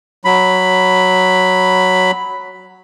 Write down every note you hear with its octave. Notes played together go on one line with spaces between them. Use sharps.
F#3 B5